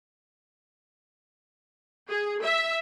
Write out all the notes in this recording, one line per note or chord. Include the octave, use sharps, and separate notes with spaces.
G#4
E5